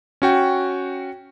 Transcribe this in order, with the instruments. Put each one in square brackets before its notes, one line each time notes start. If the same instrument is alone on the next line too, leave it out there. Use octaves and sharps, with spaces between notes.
[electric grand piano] C#4 F#4 G5